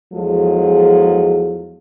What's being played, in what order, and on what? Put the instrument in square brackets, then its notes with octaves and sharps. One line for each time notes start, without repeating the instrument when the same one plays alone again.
[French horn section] E2 F3 F#3 G#3 G#4 A4